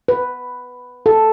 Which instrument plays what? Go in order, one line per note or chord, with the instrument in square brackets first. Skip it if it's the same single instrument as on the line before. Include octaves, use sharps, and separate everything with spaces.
[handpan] B4
A4